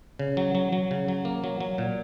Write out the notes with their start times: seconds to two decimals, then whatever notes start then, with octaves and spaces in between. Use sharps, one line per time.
0.19 C#3
0.37 F#3
0.55 F#3
0.72 F#3
0.91 C#3
1.08 F#3
1.25 A#3
1.44 F#3
1.60 F#3
1.78 A#2